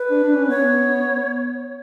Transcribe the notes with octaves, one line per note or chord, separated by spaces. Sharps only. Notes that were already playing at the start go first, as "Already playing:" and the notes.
Already playing: B4
D4
D4
C#4
B3 C#5